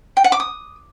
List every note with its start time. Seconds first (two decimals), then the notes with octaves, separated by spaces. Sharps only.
0.17 G5
0.24 F#5
0.32 D6
0.40 D#6